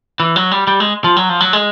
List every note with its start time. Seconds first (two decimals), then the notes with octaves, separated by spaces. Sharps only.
0.20 E3
0.36 F#3
0.52 G3
0.67 G3
0.80 G#3
1.04 F3
1.16 F#3
1.29 F3
1.40 F#3
1.53 G#3